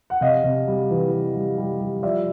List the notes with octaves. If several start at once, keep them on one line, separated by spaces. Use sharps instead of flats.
F#5
C3 D#5 F5
C3
G3
E3
E3
G3
G3
G3
F3 D5 E5